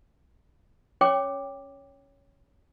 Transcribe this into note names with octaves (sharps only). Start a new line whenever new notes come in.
C#4 C#5 G5 D6